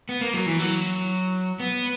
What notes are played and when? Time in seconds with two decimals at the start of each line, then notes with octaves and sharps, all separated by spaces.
0.09 B3
0.21 A#3
0.34 F#3
0.46 E3
0.60 F#3
1.60 B3